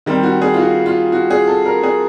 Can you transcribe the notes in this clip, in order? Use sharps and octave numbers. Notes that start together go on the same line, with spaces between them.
D#3 G3 C4
F#4
G#4
F4
F#4
F4
F#4
G#4
A4
A#4
G#4